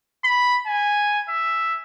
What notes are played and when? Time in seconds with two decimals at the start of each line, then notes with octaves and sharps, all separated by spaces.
0.24 B5
0.66 G#5
1.29 E5